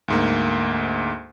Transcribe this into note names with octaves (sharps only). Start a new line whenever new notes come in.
D2 G#2 A#3